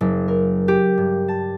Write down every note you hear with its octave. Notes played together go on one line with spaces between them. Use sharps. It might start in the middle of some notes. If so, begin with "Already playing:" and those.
F#1
A#4
G4
G2
A5